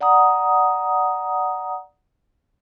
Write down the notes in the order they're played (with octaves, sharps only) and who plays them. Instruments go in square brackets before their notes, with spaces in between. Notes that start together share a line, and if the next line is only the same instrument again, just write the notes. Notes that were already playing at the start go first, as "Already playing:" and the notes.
[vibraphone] D5 F#5 A#5 D#6